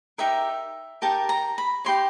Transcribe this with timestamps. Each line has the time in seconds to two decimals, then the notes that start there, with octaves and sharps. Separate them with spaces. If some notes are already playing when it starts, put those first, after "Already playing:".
0.18 D#4 G4 A#4 E5
1.02 D#4 G4 A#4 A5
1.29 A#5
1.58 B5
1.85 D#4 G4 A#4 C#5 C6